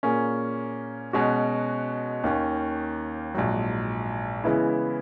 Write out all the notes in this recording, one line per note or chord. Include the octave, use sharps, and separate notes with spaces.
A#2 A#3 C#4 G#4
B2 G#3 C#4 F#4
D#2 D#3 A#3 C#4
A#1 G#2 F#3
C#3 E3 G#3 B3 E4